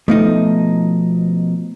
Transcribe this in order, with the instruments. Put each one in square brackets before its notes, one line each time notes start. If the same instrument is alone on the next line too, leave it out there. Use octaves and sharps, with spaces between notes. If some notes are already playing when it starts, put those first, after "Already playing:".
[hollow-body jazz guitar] B2 F3 D#4 [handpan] A3